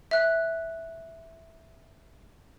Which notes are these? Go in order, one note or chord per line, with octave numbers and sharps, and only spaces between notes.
E5 F#6